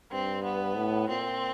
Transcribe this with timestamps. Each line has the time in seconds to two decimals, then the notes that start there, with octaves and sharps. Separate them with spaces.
0.12 G2 C4
0.43 B3
0.76 A2
1.09 A#2 C4